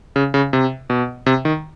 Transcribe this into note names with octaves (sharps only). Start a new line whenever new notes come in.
C#3
C#3
C3
B2
C3
D#3